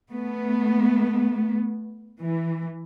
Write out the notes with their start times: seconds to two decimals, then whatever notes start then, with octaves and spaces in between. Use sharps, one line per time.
0.12 A3 B3
2.20 E3